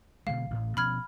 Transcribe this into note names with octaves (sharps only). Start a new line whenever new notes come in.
B2 D3 G#3 F5
A1 A2
B2 F3 C#4 B5 F6 G#6